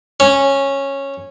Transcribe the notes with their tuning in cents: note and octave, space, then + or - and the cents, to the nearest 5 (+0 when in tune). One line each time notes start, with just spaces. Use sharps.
C#4 -10